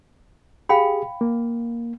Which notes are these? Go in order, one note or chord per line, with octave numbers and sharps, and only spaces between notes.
G4 G#4 F5 G5 B5
A#3